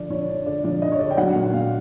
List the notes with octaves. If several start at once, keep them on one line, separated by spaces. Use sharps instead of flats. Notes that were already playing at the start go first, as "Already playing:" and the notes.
Already playing: D3 F3 D5
F3 C#5
D3
D3 D5
F3 D5
G2 D#5
C#5
D3 D5
G5
F#3 F#5
A#2
A#2 F5